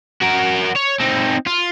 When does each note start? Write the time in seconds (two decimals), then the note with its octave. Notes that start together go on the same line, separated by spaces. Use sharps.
0.21 F#4 A#4
0.75 C#5
1.00 C4 D#4
1.46 F4